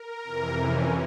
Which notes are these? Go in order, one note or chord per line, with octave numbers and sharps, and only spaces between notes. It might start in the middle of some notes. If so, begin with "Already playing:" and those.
Already playing: A#4
F2 C3 E3
C#4